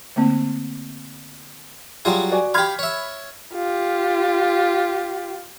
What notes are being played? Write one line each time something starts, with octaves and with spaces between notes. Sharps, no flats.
D3 A3 A#3 C4
F#3 G3 F4 G#4 C6
F#4 D5 G#5
G4 F5 B5 F6 G#6
C#5 E5
F4 G4